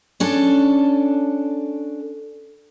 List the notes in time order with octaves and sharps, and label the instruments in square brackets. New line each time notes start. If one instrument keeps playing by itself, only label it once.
[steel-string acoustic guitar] C#4 D4 A4